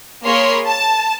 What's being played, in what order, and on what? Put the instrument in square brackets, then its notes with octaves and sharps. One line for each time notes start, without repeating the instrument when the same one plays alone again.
[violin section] A#3 G#4 A#4 C#5 B5 C6
A5